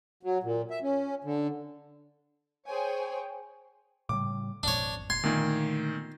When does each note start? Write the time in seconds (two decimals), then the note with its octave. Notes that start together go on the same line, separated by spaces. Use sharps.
0.23 F#3
0.43 A#2
0.71 E5
0.83 C#4
1.24 D3
2.67 G#4 C5 C#5 G5 G#5
4.09 A2 C#3 G3 D6
4.63 G#1 F2 D4 C#5
5.10 F1 C6 G#6
5.23 A#2 D3 D#3 A3 B3